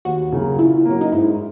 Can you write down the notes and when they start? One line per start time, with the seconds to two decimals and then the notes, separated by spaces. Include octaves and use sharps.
0.05 D#2 F#4
0.32 C#3 F#3 A#3
0.59 A#2 E4
0.85 F#3 A#3 C#4
1.01 D#4
1.12 G#2 E4